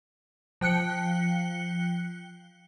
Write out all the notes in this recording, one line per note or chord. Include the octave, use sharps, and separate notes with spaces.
F3 G5 F#6 C#7